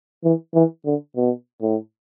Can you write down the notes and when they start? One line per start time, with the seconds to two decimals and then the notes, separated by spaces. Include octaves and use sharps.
0.24 E3
0.54 E3
0.85 D3
1.16 B2
1.62 A2